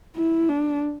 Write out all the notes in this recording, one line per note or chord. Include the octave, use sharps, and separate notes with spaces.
E4
D4